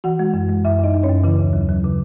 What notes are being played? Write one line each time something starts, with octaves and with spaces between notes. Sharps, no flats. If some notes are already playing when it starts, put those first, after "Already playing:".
E3 F#4 F#5
G#3
F#2
G#3
F#2 E4 E5
F#2 D#4 D#5
F#2
C#4 C#5
F#2
C#3 E3 E4
D#2
F#3
F#3
C#3